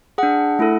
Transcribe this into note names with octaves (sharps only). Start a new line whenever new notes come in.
D4 G#4 F#5
A3 E4 A4